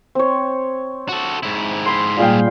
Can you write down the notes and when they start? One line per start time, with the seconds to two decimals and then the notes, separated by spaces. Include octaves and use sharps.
0.15 C4 C#5
1.09 F#4 A4
1.43 G#2 E4
1.86 B5 C6
2.19 A#2 G3 A#3 G#4 F5 G5